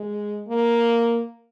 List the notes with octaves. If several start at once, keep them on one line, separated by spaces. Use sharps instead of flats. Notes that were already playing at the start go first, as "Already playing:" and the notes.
Already playing: G#3
A#3